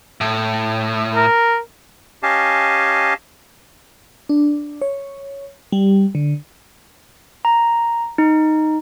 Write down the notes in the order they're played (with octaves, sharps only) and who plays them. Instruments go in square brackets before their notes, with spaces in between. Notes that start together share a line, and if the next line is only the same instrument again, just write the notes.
[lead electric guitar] A2
[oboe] A#4
[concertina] C#4 G4 D#5 F5 G#5 A5
[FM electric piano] D4
C#5
G3
D3
[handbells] A#5
D#4